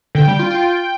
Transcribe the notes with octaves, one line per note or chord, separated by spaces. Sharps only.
D3 G5
G3
F4
F4